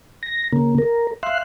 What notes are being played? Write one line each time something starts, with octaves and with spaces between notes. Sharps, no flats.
A#6
C#3 A#3
A#4
E5 F5 C6 F#6